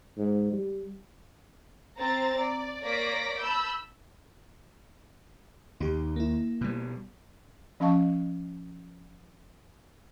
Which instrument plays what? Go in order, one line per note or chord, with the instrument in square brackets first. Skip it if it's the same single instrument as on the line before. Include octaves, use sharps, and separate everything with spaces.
[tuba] G#2
G3
[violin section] C4 C5 A#5 A6
D5
A#3 C#5 D5 A#6 B6 D7
A5 B5 E6 G6
[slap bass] D#2 [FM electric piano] D#4 G4
[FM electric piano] A#3 E4
[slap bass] B2 G3
[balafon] F3 C#4 D#5 F5 A5 C#6